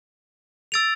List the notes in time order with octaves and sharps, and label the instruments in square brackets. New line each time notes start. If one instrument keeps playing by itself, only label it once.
[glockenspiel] E6 A6 D7 F7